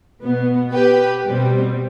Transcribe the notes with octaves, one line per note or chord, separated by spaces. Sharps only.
B2 B3
G4 B4
B2 G3 C4